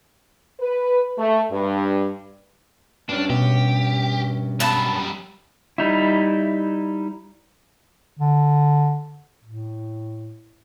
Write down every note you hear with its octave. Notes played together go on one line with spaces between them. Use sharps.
B4
A3
G2
G2 C#4 D4
B2 G4
F#2 G3 B3 A5
G3 D#4 E4
D3
A2